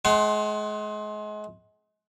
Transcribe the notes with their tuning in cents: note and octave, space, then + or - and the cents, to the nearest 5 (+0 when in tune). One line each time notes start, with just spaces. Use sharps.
G#3 +30 F#5 +40 C6 +0